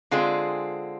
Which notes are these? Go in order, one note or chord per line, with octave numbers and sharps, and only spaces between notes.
D3 G#3 C4 F4 G#4